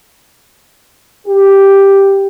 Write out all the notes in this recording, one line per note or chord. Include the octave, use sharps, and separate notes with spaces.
G4